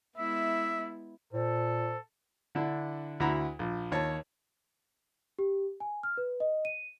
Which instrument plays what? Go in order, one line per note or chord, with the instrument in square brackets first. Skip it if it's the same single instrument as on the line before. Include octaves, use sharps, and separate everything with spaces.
[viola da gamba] G#3 B3 E4 [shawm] E5
[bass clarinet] A#2 [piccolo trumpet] A4 [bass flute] C5
[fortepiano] D3 D4 E4
D2 E4 F#4 A#5 B5
A#1
D#2 C#5 A5
[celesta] G4
G#5
F6
B4
D#5
D#7